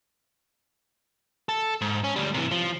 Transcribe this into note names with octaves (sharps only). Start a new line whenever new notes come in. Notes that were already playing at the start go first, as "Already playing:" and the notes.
A4
G#2
C#4
D2 G3
C3 E3
F3